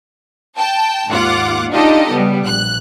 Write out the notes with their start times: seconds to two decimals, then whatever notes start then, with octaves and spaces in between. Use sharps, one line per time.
0.58 G5 A5
1.09 D#2 G#2 F4 F#5 D6
1.70 D4 D#4 F4 G4 A4 D#5
2.11 C#3 G3 B3
2.45 A#1 F#6